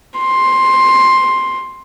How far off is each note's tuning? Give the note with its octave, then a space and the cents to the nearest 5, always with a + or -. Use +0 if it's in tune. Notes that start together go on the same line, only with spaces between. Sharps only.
C6 +10